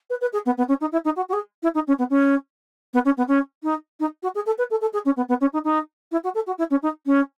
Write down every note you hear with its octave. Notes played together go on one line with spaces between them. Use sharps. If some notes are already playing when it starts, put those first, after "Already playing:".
B4
B4
G#4
B3
B3
C#4
D#4
E4
D#4
F#4
F#4
G#4
E4
D#4
C#4
B3
C#4
B3
C#4
B3
C#4
D#4
D#4
F#4
G#4
A4
B4
A4
A4
G#4
C#4
B3
B3
C#4
D#4
D#4
E4
F#4
A4
F#4
E4
C#4
D#4
C#4